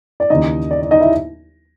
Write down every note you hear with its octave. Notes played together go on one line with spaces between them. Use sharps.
D5
D#2 C#3 E3 D#4 D#5
D5
D5
D#4 D#5
E4 E5